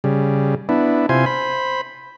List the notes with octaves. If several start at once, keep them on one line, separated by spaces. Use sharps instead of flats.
C#3 G3
B3 D4 E4
C3 E4 F4 C5 G#5
C5 B5